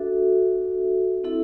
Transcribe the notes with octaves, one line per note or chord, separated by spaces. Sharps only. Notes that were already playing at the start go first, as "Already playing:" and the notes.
Already playing: D4 F#4 A4 E5
C4 E4 A4 E5